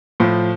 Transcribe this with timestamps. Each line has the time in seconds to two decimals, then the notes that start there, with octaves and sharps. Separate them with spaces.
0.20 A2 F3